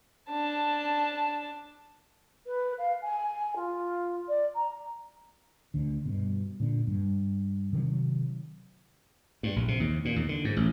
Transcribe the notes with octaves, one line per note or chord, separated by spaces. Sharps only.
D4 A5
B4
F5
G#5
F4
D5
A#5
D2 D3
G2 B2
A#2 D3
G2
C3 D#3 F#3
G2
A#1
C3
D#2
A#2
D#2
D3
G#2
A1